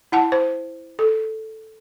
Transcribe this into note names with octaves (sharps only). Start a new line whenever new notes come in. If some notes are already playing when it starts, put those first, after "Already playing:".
E4 F#5 A5
C5
A4